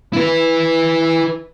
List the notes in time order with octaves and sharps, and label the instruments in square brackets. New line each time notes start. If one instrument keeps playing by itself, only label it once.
[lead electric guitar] E4 B4